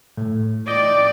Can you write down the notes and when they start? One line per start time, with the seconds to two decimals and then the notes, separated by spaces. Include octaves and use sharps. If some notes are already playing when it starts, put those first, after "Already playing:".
0.17 A2
0.68 D5 D#5 G5